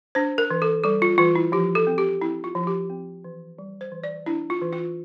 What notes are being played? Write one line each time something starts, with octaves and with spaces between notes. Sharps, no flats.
D4 C5
A#4
E3
A4
G3 A4
F4
E3 F4
E4
F3 G4
A4
C4
G4
C4 E4
F4
F3
G4
C4
E3
G3
C5
E3
D5
D4 E4
F4
E3
F4